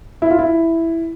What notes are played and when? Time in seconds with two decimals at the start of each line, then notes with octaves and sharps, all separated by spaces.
0.22 E4
0.31 F4
0.39 E4